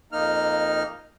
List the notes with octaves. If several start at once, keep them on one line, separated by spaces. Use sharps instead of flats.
F2 A#3 D#4 F6